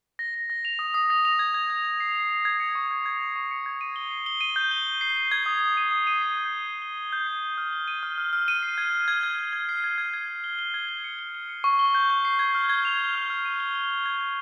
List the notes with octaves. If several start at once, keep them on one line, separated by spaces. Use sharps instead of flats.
A#6
A#6
A#6
F7
D#6
D#6
A#6
F7
G#6
G#6
G#6
G#6
C7
C7
C7
G#6
C#7
C#6
G#6
G#6
C#6
C#6
C#7
G#6
D#7
G7
C7
G7
D#7
G6
G7
G6
C7
D#7
G#6
D#6
D#6
D#7
D#6
D#7
C7
G6
C7
G7
G7
G7
G6
C7
G7
F6
G7
D#7
F6
F6
F6
D#7
C7
G#6
G#6
G#6
G#6
G#6
G#6
C7
G#6
G#6
G#6
G#6
G7
G7
G#6
G7
C#7
G7
G7
C#7
C#6
G7
G6
C#6
C7
G#6
F6
G#6
F7
F7
F6
F6
D#7
G7
G7
G7
G#6
G#6